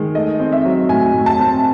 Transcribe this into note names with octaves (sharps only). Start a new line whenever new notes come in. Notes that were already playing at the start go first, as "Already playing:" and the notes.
Already playing: D#3 G#3
A3 D#5
C4
E5
F#3
A2 G#5
A2
A5
C4